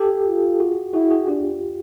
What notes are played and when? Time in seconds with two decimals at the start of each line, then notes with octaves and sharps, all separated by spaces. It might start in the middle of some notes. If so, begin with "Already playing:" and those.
Already playing: G4 A4
0.27 F4
0.60 F#4 G#4
0.94 E4 F#4 G#4
1.10 F#4 G#4
1.27 D4 F4 G4